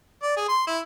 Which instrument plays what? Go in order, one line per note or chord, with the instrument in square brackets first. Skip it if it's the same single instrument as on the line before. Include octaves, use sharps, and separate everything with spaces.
[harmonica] D5
G#4
C6
E4